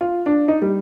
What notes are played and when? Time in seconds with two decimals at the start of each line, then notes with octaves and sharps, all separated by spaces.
0.01 F4
0.26 D4
0.48 D#4
0.62 G3